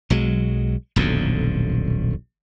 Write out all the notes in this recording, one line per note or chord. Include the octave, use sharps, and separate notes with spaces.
B1 F#3 G#3
D#1 B1 F2 D3